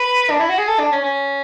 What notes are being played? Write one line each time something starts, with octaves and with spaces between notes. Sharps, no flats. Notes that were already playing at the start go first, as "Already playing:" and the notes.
Already playing: B4
D4
E4
F#4
G#4
A4
D4
C#4
C#4